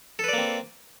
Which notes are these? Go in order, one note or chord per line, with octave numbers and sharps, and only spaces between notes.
A#3 C4 A4 B4 D5